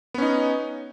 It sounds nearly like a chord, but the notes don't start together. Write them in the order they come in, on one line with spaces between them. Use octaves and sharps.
B3 C#4 D#4